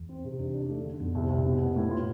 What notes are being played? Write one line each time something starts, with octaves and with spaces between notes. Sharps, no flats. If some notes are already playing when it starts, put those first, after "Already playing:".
Already playing: E2
C4
C3
E2 D4
D4
A3
D3
F2 B2
C2
C2
B2
B3
A2
F4